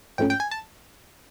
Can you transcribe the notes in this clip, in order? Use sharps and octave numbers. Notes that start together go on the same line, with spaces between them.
G#2 F3 A3 C#4 G5
G5
G#5
A5